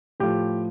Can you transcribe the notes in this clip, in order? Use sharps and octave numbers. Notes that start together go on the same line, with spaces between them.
A2 F3 G4